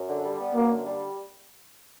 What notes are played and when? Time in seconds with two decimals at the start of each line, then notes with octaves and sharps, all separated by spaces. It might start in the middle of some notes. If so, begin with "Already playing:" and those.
Already playing: F#2
0.09 D3
0.24 G3
0.39 B3
0.55 F#2 A#3
0.70 D3
0.85 G3